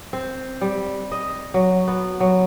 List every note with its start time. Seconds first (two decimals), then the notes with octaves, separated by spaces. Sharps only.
0.13 C4
0.61 G3
1.12 D#5
1.54 F#3
1.87 B3
2.20 F#3